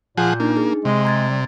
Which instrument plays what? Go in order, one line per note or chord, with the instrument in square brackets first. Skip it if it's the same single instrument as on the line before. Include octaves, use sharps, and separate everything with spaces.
[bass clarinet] A#2 [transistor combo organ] F3 G#4 F#5 [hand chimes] G6
[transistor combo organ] A#3 [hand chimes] D4 D#4
[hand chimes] G#4
[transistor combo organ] C3 [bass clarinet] G#3
[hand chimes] A#5 G#6 A6
[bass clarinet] G3